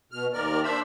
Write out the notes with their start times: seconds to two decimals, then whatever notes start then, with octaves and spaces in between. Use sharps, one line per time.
0.12 B2 F6
0.33 D#2 D#3 A#4 D5 F6
0.64 D4 C5 E5 B5 E6